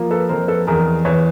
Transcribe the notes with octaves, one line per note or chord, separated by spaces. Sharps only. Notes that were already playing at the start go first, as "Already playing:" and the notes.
Already playing: F3 A#3
A4 B4
F2 A#4 C5
A4 B4
E2 G#4 A#4
E2 B4 C#5